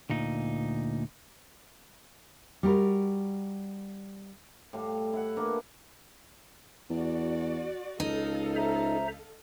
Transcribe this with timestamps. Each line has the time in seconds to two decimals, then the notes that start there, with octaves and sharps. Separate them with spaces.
0.10 D2 A#2 D#4
2.63 G3 F#4 A#4
4.73 A2 G3 F5
5.13 E4 F#5
5.37 A#3 D4 B4
6.90 E2 F#4 D5
8.00 C#2 D#4 A4 D#5 F5
8.56 C5 E5 A#5